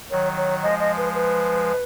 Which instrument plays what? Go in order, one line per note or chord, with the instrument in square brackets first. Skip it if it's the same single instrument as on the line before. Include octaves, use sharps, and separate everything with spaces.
[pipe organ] D#3 F#3 [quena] C#5
[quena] C#5
[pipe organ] F3 G#3 [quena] D#5
[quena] D#5
B4
B4